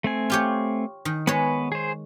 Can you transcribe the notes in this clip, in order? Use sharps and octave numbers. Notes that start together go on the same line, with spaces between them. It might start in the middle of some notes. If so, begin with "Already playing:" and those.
A3 C4 G#5
F4 G4 C#5
D#3
G#3 B3 B4 C#5
G#4 C5